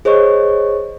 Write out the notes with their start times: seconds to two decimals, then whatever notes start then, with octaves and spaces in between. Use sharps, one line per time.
0.05 G#4 C5 C#5 D#5 C#6